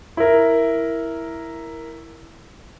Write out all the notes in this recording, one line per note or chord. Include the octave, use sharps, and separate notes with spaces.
E4 A#4